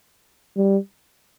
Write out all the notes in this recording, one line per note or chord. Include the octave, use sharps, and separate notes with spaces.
G3